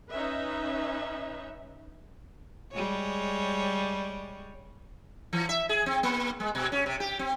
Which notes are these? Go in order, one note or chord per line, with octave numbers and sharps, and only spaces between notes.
C#4 D#4 B4 E5
G3 G#3 C#5
E3
E5
G#4
C4
A#3
G#3
B2
C#4
C3
G4
C4